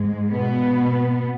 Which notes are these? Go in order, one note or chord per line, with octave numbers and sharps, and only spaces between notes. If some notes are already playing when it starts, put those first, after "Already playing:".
Already playing: G#2 G#3
B2 B3